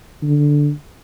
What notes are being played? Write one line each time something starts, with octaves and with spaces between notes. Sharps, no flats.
D3